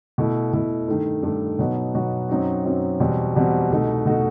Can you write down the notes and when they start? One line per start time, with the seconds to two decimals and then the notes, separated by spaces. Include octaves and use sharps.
0.18 B2 A3 E4
0.53 B2 A3 E4
0.88 G2 D#3 A3
1.23 G2 D#3 A3
1.59 B2 F#3 B3 D#4 F#4
1.94 B2 F#3 B3 D#4 F#4
2.29 F#2 F#3 C4 D#4 F#4
2.65 F#2 F#3 C4 D#4 F#4
3.00 E2 B2 G3 C4 F#4
3.35 E2 B2 G3 C4 F#4
3.70 C2 B2 A3 D#4 F#4
4.06 B2 A3 D#4 F#4